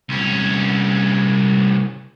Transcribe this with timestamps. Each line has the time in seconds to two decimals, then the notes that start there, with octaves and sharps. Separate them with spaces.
0.09 C2 C#4